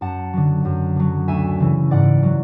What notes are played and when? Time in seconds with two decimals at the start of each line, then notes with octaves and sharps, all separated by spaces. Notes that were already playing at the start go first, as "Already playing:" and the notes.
0.01 F#2 F#5 A5
0.33 D3 F#3
0.65 F#2
0.96 D3 F#3
1.28 D2 E5 G#5
1.60 C#3 E3
1.91 G#2 D5 F#5
2.23 F#3